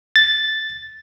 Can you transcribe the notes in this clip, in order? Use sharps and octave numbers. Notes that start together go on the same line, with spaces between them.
A6